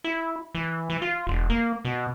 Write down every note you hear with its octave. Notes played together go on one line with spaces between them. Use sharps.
E4
E3
E3
F4
E1
A#3
B2